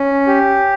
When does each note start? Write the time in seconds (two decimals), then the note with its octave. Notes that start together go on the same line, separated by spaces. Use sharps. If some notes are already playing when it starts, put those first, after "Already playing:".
Already playing: C#4
0.27 G4